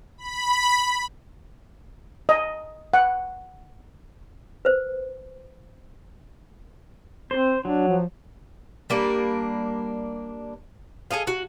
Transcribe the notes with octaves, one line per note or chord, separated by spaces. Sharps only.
B5
D#5
F#5
B4 C5
C4 C5
F#3 D4
F3
G3 A#3 D4 A#4
G#4 A4 D#5 F5
F#4